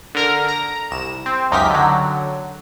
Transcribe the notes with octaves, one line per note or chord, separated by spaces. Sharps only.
D3 A#4 A#5
A#5
C2 E7
C4
C#2 F#2 D#4 G4 A#4 B6
D3 F#3